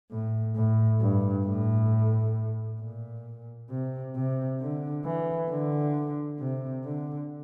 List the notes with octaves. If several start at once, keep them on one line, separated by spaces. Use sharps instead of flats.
A2
A2
G2
A2
A#2
C3
C3
D3
E3
D3
C3
D3